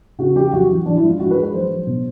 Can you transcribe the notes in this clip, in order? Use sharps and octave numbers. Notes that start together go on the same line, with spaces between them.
C#3 F#4
G3 G4
F#2 F#4
E3
E3 D4
E4
G2
F4
G2 F#4
B4
G#3
B4
F#3 C5
F#3
B2